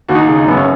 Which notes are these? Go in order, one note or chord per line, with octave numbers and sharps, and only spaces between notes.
D#2 F#4
D#4
C#3 D#4
D#4
F#2 B3
C#4